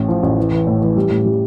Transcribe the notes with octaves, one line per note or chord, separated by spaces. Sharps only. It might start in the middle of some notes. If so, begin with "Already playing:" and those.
Already playing: A1 A2
F3
A1
E3
E3
A2
E3
G3
A2
G3